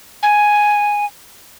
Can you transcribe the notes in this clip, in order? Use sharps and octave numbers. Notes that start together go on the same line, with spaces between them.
G#5